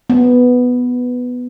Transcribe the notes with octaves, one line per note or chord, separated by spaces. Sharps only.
B3